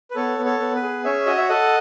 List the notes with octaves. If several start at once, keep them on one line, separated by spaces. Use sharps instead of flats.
B4
B3 A4 C#5
B3
A4 C#5
B3
B4
G#4
C#4 C#5 E5
F#4 D#5
E5
A4 D#5 F#5